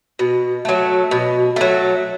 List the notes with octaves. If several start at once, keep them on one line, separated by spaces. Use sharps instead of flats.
B2
F#3 A3
B2
F#3 A3